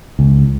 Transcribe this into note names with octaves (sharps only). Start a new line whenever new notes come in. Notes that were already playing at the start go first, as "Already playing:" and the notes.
C#2